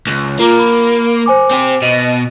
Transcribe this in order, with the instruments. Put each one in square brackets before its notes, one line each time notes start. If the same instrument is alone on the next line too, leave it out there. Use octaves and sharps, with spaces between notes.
[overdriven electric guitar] C#2
[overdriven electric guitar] A#3 [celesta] F4 A#5 D6
[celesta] B5
C5 G#5 D6
[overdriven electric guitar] C4 G4
[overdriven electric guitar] B2 [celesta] D#5